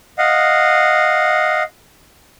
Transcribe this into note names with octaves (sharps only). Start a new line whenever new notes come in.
D#5 F5 F#5